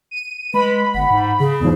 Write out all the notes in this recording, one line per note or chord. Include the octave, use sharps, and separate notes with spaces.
D#7
G#3 B4 B5
G1 F#5
G#2
C#3 G#4
E2 G#2 F3